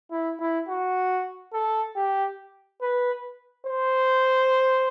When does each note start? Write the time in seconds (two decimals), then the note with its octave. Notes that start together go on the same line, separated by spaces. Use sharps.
0.12 E4
0.40 E4
0.69 F#4
1.53 A4
1.96 G4
2.82 B4
3.67 C5